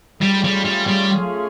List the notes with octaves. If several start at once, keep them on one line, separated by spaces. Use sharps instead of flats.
G3 A3 C#4 F4 G#4
G3
G3
G3